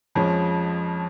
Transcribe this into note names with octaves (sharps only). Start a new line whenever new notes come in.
F2 F3 G#3 C#4